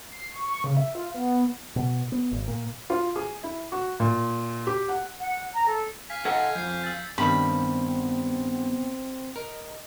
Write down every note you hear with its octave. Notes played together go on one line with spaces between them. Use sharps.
C7
C#6
C#6
C#3
E5
F4
B3
B2
B3
G#1
A#2
F4
G#4
E4
F#4
A#2
G4
F#5
F#5
A#5
A4
F5 G#5 B6
A4 D#5 F#5 G#6
F2 G6 C7
E6 A6
G2 D#3 G3 B3 C4 B5
A#4 D#5